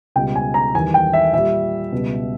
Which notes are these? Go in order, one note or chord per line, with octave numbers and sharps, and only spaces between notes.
C#2 B2 G3 G5
G#5
A#5
E2 D#3 G3 G#5
G5
E5
A#2 G3 E5
C#2 B2 G3